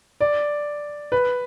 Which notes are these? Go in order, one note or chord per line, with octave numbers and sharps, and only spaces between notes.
D5
B4